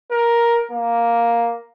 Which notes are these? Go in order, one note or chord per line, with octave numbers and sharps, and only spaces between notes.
A#4
A#3